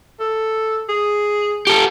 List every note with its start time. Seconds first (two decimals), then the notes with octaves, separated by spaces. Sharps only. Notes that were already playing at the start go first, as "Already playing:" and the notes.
0.20 A4
0.89 G#4
1.67 G4 A4